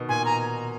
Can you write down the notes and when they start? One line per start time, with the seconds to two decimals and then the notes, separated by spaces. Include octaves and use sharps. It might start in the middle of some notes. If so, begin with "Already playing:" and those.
Already playing: B2 D#3
0.09 A#2 G#5
0.25 A#5